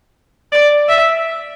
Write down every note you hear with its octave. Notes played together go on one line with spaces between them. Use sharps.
D5
E5